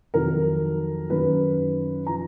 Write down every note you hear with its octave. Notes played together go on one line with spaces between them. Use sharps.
F2 D#3 F#3 A#4
F#2 D#3 F#3 B4
F3 A#5